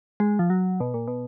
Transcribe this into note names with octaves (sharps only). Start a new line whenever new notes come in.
G#3
F3
F#3
B2
A#2
B2